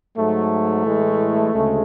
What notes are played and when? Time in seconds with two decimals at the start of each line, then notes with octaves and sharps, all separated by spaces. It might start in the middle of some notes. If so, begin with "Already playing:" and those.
0.16 G#2 F#3 A3
0.84 A2 E3 G#3
1.53 D2 C#3 G#3